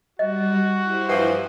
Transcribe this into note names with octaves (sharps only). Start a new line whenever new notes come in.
G3 F#4 D#5
E4 G4 C5
G2 E3 F3 F#5